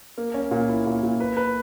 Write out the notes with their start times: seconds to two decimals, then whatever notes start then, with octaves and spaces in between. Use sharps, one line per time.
0.18 A#3
0.34 C#4
0.51 A#2
0.69 E4
0.86 A#2
1.03 A#2
1.20 B4
1.37 B4